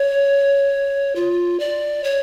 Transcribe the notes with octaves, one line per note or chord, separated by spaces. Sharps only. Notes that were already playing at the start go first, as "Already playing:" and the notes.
Already playing: C#5
F4
D5
C#5